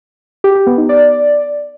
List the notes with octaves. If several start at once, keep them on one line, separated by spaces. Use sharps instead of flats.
G4
G4
B3
D#4
D5